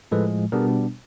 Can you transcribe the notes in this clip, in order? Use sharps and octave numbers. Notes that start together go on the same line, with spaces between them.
A2 F3 G#3 A4 B4
B2 G3 B3 D4 G#4 A#4